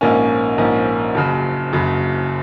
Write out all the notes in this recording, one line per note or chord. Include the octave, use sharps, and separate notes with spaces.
A#1 G#2 F3 A#3 C#4
A#1 G#2 F3 A#3 C#4
F#1 F#2 C#3
F#1 F#2 C#3